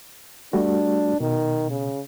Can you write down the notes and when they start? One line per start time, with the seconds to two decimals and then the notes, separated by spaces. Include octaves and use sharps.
0.53 G3 A3 D4 F#4
1.20 B2 D#3
1.70 C#3